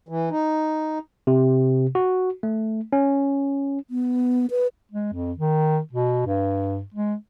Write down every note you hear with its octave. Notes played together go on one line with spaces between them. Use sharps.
E3
D#4
C3
F#4
A3
C#4
B3
B4
G#3
F2
D#3
B2
G2
G#3